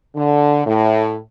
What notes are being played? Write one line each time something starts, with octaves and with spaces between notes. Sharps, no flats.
D3
A2